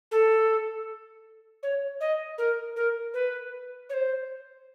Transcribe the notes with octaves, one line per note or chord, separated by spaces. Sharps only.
A4
C#5
D#5
A#4
A#4
B4
C#5
C5